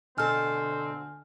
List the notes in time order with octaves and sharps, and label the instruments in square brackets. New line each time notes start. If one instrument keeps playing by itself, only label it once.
[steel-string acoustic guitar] B2 A4 [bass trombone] D3 [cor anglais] C4 [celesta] G#5 F6